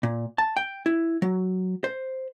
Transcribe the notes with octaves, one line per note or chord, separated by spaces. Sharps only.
A#2
A5
G5
E4
F#3
C5